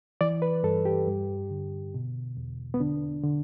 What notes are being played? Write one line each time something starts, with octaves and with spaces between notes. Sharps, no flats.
E3 D5
B4
G2 A4
G4
G2
D3
B2
E2
B3
D3 D4
D3